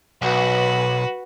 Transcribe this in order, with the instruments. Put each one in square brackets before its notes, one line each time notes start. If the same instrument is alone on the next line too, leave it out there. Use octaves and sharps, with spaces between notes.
[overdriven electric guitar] B1 [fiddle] F#4 B4